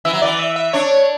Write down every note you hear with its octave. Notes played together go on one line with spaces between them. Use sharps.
E3 E5
F#3
E3 D5
E5
E5
D4 C#5
C#5